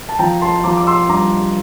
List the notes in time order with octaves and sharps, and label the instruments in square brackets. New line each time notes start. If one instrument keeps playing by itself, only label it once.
[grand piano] A5
F3 G5 A#5
A5 C6
F3 A#5 D6
D6
C6 E6
G2 A#5 D6